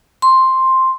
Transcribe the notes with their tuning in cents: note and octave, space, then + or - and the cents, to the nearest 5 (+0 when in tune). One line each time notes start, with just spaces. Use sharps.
C6 +5